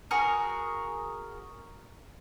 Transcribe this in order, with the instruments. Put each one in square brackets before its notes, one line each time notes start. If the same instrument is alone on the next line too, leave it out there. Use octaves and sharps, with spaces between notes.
[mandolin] F#4 G#4 A#4